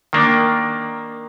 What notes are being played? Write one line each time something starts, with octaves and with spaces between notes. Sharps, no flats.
D#3 A#3 D4